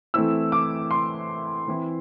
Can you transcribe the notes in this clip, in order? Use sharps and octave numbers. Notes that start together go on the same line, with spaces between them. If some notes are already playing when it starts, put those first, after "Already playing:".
E3 A3 C4 E4 E6
D6
C6
E3 C4 E4